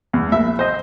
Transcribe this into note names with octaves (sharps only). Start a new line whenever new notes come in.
E2
A#1 E5
C5 D#5